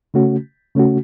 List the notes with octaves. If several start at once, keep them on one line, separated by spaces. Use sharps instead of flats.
C#3 A3 C#4 F#4
C#3 A3 C#4 F#4